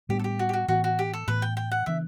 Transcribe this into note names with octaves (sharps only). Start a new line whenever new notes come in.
A2 G3 B3 D4 G4
A4
G4
F#4
G4
F#4
A2 E3 B3 F#4
F#4
G4
A4
A2 E3 B3 B4
G5
G5
F#5
C#3 E3 B3 D4 E5